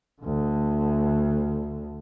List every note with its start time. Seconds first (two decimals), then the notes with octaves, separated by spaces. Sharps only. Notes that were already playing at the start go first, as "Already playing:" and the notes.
0.22 D2 D3